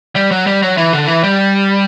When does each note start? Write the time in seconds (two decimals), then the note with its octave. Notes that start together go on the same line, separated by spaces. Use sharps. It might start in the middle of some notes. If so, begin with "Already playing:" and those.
0.16 G3
0.31 F#3
0.47 G3
0.62 F#3
0.77 E3
0.93 D3
1.07 E3
1.24 G3